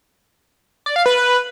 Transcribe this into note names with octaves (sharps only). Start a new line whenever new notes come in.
D5
F5
B4